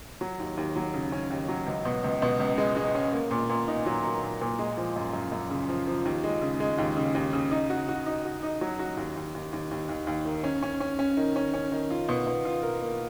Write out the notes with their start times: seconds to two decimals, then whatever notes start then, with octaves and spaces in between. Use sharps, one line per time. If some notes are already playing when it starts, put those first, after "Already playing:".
0.21 F#3
0.39 D#2
0.57 D#2
0.76 F#3
0.94 C#3
1.12 C#4
1.30 D#2
1.48 F#3
1.67 C#2
1.85 B2
2.04 C#2
2.22 B2
2.40 C#2
2.58 G#3
2.76 G#3
2.95 C#4
3.13 A#3
3.31 A#2
3.49 A#2
3.68 D#4
3.86 F#3
4.04 A#3
4.23 A#2
4.41 A#2
4.59 G#3
4.77 F3
4.96 F#2
5.13 F#2
5.32 F#2
5.51 C#3
5.69 F3
5.87 F3
6.05 D#2
6.24 G#3
6.42 C#3
6.60 G#3
6.78 D#2
6.97 C#3
7.15 D#2
7.33 C#3
7.51 D#4
7.70 F#4
7.88 F#4
8.06 D#4
8.25 F#4
8.43 D#4
8.61 F#3
8.79 F#4
8.97 D#2
9.16 D#2
9.35 D#2
9.53 D#2
9.71 D#2
9.89 D#2
10.07 D#2
10.25 D#3
10.44 C#4
10.62 C#4
10.80 C#4
10.99 C#4
11.17 D#3
11.36 C#4
11.54 C#4
11.72 D#3
11.91 F4
12.09 B2
12.27 B2
12.45 F4
12.63 A#4
12.81 A#3